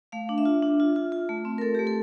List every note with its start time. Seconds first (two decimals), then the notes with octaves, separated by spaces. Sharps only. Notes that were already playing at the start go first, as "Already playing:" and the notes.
0.12 A3 F5
0.29 D4
0.38 E5
0.45 F4
0.62 D4
0.80 F4
0.96 F4
1.12 F4
1.29 A3
1.45 C4
1.58 A#4
1.62 A3 A4
1.75 G4
1.79 A3
1.87 A4